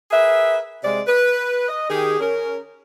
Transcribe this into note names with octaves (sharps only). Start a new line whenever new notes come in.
G#4 A#4 B4 E5
C3 G#3 D5
B4
D#5
D#3 G4 G#4
C#4 A#4